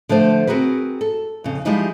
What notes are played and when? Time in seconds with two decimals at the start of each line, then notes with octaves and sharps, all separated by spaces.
0.09 D3 F3 A3 C5
0.47 C4 F#4 G#4 A#4 B4
1.01 A4
1.44 F2 C#3
1.65 F3 G3 G#3 D#4 E4